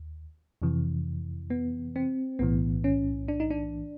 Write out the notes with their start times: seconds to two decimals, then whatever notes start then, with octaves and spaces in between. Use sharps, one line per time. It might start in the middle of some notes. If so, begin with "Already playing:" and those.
Already playing: D#2
0.62 F2 C3 E3
1.50 B3
1.96 C4
2.39 B1 A2 E3 B3
2.84 C#4
3.28 D4
3.40 D#4
3.50 D4